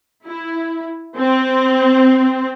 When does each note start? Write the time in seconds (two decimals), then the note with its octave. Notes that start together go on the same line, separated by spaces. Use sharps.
0.24 E4
1.17 C4